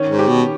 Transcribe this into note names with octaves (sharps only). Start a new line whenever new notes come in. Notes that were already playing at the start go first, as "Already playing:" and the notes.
Already playing: D#3 C#4
G#2
G4
B2